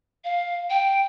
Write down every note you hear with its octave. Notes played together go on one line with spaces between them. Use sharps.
F5
G5